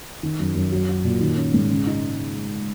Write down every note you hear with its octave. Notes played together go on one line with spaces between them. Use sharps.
D#3
F#2
F#2
F#3
F#4
A#2
D#3
C#4
G#2
C#3
D#4